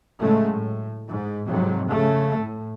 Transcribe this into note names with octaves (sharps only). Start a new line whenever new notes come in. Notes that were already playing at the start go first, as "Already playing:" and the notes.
A2 C#3 F#3 G#3 A3
A2
G#2
F2 G#2 C3 F#3
C#3 A3
A2